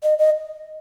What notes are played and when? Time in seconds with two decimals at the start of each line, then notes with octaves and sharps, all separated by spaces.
0.03 D#5
0.19 D#5